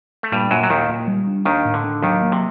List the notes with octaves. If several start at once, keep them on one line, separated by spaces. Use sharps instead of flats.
A3
G2 A#2 G3
F#2 A#2 F#3
F#3
D#2 A#2 D#3
A#2
G3
D4
D#2 D#3 D4
A2
D3
D4
D#2 D#3 F#3
A#3
C3